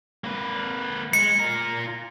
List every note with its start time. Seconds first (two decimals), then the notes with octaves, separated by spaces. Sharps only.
0.24 A#3 B4
1.13 G#3 C#7
1.40 F4 A#4